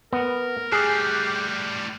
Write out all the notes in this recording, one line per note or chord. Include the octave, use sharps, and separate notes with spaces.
B3 A#4
A2 G3 G4 G#4 F6 F#6 C7